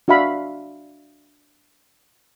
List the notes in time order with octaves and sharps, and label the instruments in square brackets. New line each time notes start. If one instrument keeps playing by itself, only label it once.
[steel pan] D4 F#4 E5 F5 B5